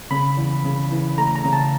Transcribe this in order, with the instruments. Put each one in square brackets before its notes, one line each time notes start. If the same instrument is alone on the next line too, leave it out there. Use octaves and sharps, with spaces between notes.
[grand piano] C#3 [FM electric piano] B5
[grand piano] E2
C#3
E3
[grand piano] A3 [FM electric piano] A#5
[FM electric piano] A#5
[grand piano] C#3
[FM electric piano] A5